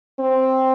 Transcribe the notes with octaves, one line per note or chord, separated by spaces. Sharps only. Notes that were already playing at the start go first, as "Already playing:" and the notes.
C4